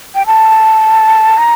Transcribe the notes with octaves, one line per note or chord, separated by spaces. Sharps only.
G5
A5
A#5